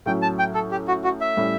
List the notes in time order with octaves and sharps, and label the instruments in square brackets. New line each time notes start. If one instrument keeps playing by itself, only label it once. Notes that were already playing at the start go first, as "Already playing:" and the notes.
[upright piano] A2 F#3 C#4 [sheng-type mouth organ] G5
[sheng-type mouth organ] A5
G5
A4
G4
F#4
F#4
E5
[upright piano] A2 G3 C#4